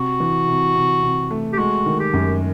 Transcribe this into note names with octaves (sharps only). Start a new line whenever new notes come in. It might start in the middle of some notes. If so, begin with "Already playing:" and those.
Already playing: C3 F#4
E3
C3
C3
C3
A3
G4
G#3 F#4
D#3
G4
F#2